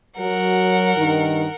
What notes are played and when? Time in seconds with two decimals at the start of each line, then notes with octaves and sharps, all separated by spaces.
0.18 F#3 A#4 F#5
0.96 G2 D#3